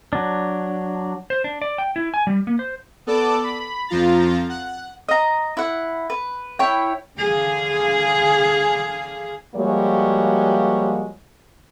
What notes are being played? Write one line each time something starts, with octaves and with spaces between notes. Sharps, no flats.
F#3 D4
C5
D4
D5
G5
E4
G#5
G3
A#3
C5
B3 A4 D5 A5 D6
B5
F2 F3 F4 A#5 A6
F#5
D#5 A#5
E4 F#5
B4
E4 C#5 G5
D3 G#4 F5
F3 G3 G#3 A#3 F#4 C#5